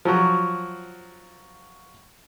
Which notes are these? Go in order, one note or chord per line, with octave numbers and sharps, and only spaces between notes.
F3 F#3 F#4